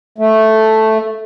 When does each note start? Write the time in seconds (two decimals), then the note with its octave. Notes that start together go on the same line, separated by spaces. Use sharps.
0.18 A3